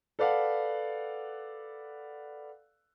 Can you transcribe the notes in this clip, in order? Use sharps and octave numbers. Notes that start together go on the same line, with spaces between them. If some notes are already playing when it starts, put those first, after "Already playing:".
A4 B4 D5 F5 F#5